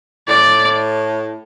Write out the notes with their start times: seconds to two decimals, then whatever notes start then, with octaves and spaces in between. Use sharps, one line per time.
0.28 A2 D5